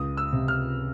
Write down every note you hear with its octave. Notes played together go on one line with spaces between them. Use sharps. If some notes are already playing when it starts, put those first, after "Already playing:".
Already playing: C#2 D#6
E6
C3
F6